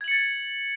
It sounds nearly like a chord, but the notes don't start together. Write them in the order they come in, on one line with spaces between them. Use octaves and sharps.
G#6 F#7 C#7 A6